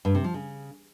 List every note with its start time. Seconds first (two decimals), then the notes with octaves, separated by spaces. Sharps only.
0.05 G2
0.15 C3
0.24 F3
0.34 C#3